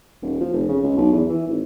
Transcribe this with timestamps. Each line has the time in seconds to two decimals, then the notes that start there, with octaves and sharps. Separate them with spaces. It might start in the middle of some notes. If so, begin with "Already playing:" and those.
0.22 D#1
0.40 F3
0.53 F1
0.68 C#3
0.83 C#2
0.97 B1
1.13 E2
1.29 E3
1.47 G#1